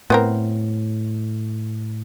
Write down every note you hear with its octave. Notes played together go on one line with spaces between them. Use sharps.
A2 B3 C4 A#4